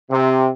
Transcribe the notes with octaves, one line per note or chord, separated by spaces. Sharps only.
C3